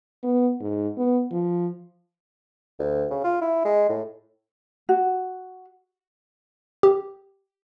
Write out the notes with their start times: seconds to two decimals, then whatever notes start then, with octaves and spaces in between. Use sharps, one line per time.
0.23 B3
0.60 G#2
0.97 B3
1.31 F3
2.79 D2
3.11 C#3
3.24 F4
3.42 E4
3.65 G#3
3.89 A2
4.89 F#4
6.83 G4